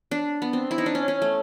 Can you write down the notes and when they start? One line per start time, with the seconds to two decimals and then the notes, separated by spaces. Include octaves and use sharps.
0.11 D4
0.42 B3
0.53 C4
0.71 E4
0.78 D#4
0.86 D4
0.95 C#4
1.08 C#4
1.22 A3